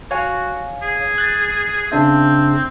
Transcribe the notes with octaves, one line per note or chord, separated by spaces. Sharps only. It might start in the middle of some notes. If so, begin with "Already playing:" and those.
F#4 C#5 F5 G#5
G#4
F#6 A6
C#3 C4 D4 E5